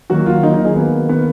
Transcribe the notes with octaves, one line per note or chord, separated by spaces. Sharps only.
D#3 F#3 A#3 F#4
F4
D#3 F#3 A#3 D#4
D#4
G#4
D#3 A#3 B3
D#3 A#3 B3